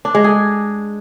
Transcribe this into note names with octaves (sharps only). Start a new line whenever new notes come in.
D4
G#3
G#4